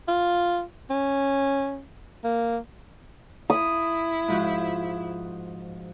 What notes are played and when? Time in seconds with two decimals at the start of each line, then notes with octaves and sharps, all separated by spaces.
0.08 F4
0.90 C#4
2.24 A#3
3.50 E4 D#6
4.28 G#2 F3 F#4